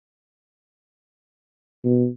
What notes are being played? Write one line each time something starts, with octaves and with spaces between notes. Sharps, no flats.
B2